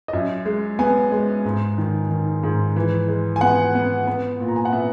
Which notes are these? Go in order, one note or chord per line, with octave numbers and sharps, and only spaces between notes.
D#5
F#2 E5
G#3
B3 G#5
G#3
G#2
D#3
D#3
G#2
E3
G#3
G#5
B3 F#5
B3
B3
A#2
A#5
G#5
F#5
B3 E5